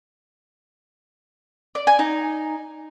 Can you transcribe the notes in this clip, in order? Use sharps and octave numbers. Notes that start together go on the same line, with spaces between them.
D5
G#5
D#4